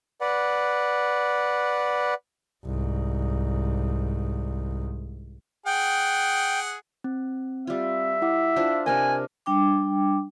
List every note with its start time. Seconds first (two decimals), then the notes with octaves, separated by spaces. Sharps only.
0.21 B4 D5 F#5
2.65 C2 G#2
5.66 G#4 F#5 G5
7.04 C4
7.67 G3 F4 E5
8.22 E4 F#5 D6
8.56 D4 F4 C5
8.86 C3 D4 A#4 D#5 G#5 F6
9.46 G3 D4 G5 D6